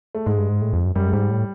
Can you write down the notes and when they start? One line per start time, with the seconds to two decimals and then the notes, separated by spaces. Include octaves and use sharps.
0.15 A3
0.26 G#2 G#3
0.38 G2
0.49 G#2
0.61 A2
0.73 F2
0.85 F#2
0.95 F#2 G3
1.07 G#3
1.13 G#2 G3
1.31 A2